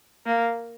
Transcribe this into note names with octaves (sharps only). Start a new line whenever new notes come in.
A#3